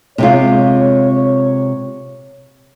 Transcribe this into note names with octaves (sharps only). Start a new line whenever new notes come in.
C3 G#3 F4 C#5